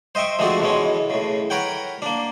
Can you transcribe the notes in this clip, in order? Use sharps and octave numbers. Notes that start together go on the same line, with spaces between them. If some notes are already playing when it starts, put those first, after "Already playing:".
C5 D#5 E5 G5 C#6
F3 G#3 A3 C4 D4 F#4
B2 E3 G#3 C#4
A2 C#3
A#4 B4 C#5 F#5 G5
A#3 D4